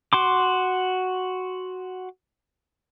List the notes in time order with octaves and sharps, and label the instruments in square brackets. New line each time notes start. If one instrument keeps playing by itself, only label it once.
[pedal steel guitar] F#4 C6 D6